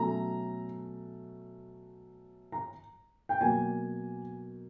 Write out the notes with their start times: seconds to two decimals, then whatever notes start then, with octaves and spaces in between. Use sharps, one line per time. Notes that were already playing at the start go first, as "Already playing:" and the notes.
Already playing: B2 F#3 A3 C#4 A#5
2.52 A#5
3.29 G5
3.41 B2 F#3 A#3 G#5